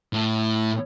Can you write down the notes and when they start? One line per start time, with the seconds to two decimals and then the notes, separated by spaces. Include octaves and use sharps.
0.13 A2